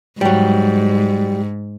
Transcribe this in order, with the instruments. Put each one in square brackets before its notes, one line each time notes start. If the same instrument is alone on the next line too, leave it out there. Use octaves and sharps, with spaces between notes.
[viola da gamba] G#2 [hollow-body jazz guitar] F#3 G3